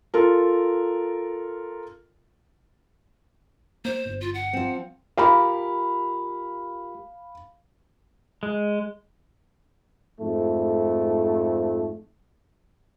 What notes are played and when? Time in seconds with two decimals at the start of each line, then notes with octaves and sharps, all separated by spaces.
0.14 F4 A4 A#4
3.85 A#3 C5
4.06 G1
4.21 F4
4.34 F#5
4.53 F3 C4
5.18 F4 G4 A#4 F5 B5
8.43 G#3
10.20 F2 G#2 A3